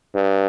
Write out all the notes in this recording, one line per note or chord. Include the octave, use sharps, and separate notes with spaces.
G2